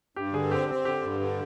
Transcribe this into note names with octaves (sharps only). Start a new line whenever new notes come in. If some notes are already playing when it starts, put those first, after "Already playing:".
G2 G4
D3 G#4
C4 G4
C4
D3 G4
G2
D3